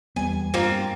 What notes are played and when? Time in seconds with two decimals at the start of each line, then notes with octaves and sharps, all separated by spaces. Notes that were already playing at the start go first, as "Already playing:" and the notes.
0.16 E2 G3 B3 G#5
0.54 G2 A#3 C4 F4